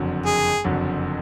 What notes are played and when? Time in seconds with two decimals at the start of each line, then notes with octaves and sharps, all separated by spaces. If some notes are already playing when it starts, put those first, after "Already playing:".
Already playing: F#1 F2 D3 F#3
0.26 G#4
0.64 F#1 F2 D3 F#3